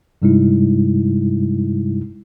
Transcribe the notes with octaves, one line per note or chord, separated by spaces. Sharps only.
G2 C3 G3 G#3 D#4 E4